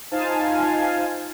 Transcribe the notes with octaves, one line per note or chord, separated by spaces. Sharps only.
D#4 F4 C5 F5 G#5 A5